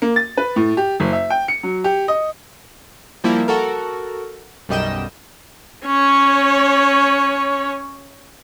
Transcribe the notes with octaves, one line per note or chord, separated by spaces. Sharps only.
A#3
A6
B4
A2
G4
F#1
E5
G5
C#7
F#3
G4
D#5
F3 G3 A#3 E4
F#4 A4 A#4
B1 F#2 G3 D#5 G5 E7
C#4 C#5